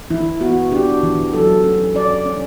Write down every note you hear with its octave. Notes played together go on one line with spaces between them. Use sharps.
E3 E4
B3 F#4
D4 G4
E3
F#3 A4
C#4
C#4 D5
C#4